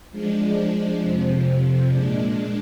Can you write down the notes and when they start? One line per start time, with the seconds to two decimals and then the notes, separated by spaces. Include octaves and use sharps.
0.10 F3 G#3 D4
1.00 F2 C3 F3
1.89 A#2 G#3 D4